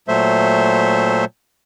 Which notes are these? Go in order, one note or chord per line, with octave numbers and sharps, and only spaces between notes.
A#2 F#3 A3 C5 E5